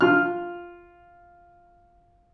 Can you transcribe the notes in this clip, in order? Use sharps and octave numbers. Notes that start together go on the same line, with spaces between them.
F4 F6